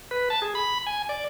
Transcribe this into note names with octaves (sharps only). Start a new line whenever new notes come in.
B4
A5
G#4
B5
G#5
D5